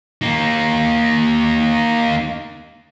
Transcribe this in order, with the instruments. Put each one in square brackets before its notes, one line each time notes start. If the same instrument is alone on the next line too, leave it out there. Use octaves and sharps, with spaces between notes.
[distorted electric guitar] A#3 D#4